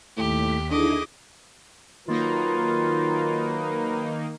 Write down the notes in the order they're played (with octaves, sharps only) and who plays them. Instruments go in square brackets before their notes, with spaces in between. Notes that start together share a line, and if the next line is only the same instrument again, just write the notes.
[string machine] D#2 B6 [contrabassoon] A2 [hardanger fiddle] G4
[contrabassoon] D3 [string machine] D#4 E4 G#4 [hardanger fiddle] D#5 D6
[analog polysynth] D#3 A#3 D#4 [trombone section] F#3 A#4 B4 [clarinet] F4